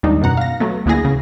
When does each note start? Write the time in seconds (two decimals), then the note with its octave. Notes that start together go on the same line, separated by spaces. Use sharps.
0.03 D#2 G#2 G3 D4 D#4
0.22 F#2 B2 F#5 A#5
0.37 F5 A#6
0.60 F#3 A3 B3
0.86 D2 A#3 B3 E4 G#4 A#6
1.05 C#3